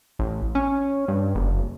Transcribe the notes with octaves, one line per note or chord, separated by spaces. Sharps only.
A1
C#4
G2
F#1